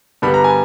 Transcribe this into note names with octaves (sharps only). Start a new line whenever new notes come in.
G2 D3 G3 B3 B5
A#5
G#5